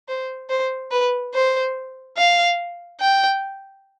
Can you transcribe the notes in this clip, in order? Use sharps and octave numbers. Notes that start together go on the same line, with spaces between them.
C5
C5
B4
C5
F5
G5